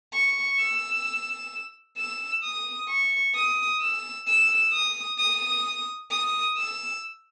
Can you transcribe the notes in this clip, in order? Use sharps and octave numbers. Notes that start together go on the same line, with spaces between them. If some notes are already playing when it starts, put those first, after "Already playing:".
C#6
E6
E6
D#6
C#6
D#6
E6
E6
D#6
D#6
D#6
E6